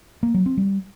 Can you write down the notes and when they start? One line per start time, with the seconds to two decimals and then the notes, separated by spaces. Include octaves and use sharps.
0.23 A#3
0.34 F#3
0.46 C4
0.57 G3